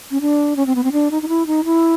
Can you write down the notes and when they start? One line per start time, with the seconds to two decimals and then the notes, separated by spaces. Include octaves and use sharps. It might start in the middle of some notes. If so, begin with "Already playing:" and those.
0.11 C#4
0.21 D4
0.56 C#4
0.66 C4
0.75 B3
0.84 C4
0.92 D4
1.11 D#4
1.22 D#4
1.28 E4
1.47 D#4
1.65 E4